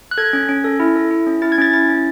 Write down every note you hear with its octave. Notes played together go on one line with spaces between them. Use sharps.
F#6
A4 G#6
C#4
C#4
A4
E4
A4
E4
C#4
E4 A6
G#6
C#4 A6
E4 A6
C#4